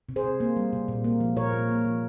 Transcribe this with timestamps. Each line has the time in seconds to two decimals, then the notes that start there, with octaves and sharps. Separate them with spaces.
0.09 C3
0.16 G#4 C5
0.24 C3
0.40 A#3
0.57 G3
0.73 C3
0.88 A#2
1.04 A#3
1.20 F3
1.36 A#2 A#4 C#5
1.53 A#2
1.69 A#3
1.85 F3